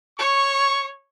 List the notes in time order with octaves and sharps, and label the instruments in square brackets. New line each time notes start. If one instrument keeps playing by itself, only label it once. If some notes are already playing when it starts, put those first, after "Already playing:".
[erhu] C#5 [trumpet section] C#6